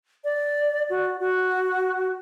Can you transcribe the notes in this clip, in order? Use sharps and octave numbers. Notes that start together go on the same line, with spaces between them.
D5
F#4
F#4